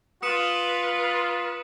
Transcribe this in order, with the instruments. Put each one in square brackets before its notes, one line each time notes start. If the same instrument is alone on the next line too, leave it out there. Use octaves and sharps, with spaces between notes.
[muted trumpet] F4 [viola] B4 [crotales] D#6 C#7 E7